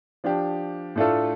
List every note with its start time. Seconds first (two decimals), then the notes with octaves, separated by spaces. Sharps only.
0.24 F3 D4 G4
0.96 A2 A3 D4 F4 A4